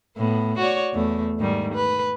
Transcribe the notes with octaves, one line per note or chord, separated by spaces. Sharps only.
A2 B3
F#4 C#5 D5
E2 A3
G#2 D#3 G3
B4